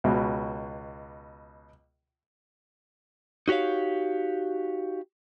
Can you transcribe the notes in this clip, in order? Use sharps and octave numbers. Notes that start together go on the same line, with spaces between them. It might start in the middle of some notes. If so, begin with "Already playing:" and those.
C#2 B2
D#4 F#4 G4 C#5 F5